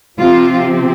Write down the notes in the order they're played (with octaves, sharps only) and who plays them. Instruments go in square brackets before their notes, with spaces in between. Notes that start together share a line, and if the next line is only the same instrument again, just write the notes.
[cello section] C3 F3 C4 F4